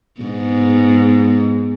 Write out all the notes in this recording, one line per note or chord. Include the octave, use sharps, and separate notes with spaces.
G#2 B3